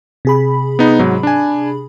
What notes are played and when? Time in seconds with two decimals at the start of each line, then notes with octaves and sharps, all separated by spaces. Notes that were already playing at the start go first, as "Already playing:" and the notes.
0.25 C3 G#4 B5
0.79 B3 D#4
0.99 G#2 F#3
1.23 D4 G#5